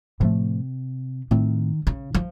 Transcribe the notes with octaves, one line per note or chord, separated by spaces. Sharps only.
A2 C3 F3 A3
A2 D#3 A3 C4
C#3
F3